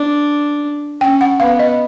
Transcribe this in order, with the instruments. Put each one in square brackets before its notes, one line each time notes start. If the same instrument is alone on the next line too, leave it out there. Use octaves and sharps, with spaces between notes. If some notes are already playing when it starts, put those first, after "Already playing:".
Already playing: [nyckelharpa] D4
[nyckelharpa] C#4 [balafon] G5
[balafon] F#5
[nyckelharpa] B3 [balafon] F5
[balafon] D#5